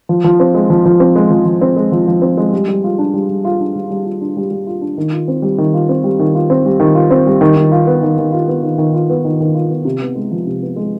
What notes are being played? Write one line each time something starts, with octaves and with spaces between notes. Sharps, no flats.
F3
F3
C4
G#3
F3
F3
C4
G#3
F3
F3
C4
G#3
F3
F3
C4
G#3
G3
G3
F4
D4
G3
G3
F4
D4
G3
G3
F4
D4
G3
G3
F4
D4
D#3
F4
C4
G3
D#3
F4
C4
G3
D#3
F4
C4
G3
D#3
F4
C4
G3
D#3
D#3
F4
B3
D#3
D#3
F4
B3
D#3
D#3
F4
B3
D#3
D#3
F4
B3
C3
B3
G#3
F3
C3
B3
G#3